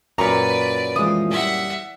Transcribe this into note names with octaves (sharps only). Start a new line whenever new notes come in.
F#2 A#2 A#3 B4 D5 A#5 C#6
E3 F3 G#3 D#6
G3 E5 F#5